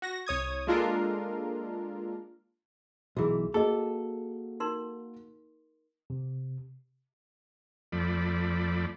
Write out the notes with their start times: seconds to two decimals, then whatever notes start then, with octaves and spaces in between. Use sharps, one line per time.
0.02 F#4 A#6
0.26 C2 C#5 D#6 G#6
0.67 G#3 A#3 D4 F4 A4 A#4
3.17 B1 E3 F#4 G#4
3.54 A#3 F#4 G#4 A4 D#5
4.60 D#4 A#4 C6
6.10 C3
7.92 F2 F3 A3 D5 B5